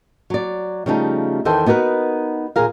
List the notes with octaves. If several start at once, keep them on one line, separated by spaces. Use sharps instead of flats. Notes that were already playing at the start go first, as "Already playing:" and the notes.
F#3 D5
C#3 F3 G3 A3 C4 D#4
E2 D#3 E3 A4 C5 G5
B3 D#4 F#4 A#4 B4
D#2 A#2 G#4 A#4 F5